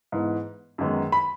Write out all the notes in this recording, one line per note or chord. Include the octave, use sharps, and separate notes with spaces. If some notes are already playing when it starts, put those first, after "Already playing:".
G#2 E3 B3
F#2 D#3 G#3 B3
B5